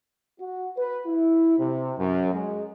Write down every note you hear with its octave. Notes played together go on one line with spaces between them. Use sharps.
F#4
B4
E4
C3
F#2
G#3